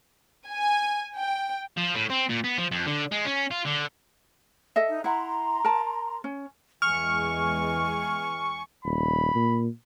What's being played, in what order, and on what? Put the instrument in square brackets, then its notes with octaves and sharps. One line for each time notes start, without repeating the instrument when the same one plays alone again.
[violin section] G#5
G5
[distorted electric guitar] F3
A2
C4
A#2
B3
F3
F2
D3
G#3
C#4
F4
D3
[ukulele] A4 D#5 E5
[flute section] D#4
[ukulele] E4 F#5 [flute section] A#5 C6
[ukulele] A#4 A5
C#4
[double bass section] E2 E3 G#3 [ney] G#5 [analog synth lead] C#6 [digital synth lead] F6
[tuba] D#1 [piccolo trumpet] B5
[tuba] A#2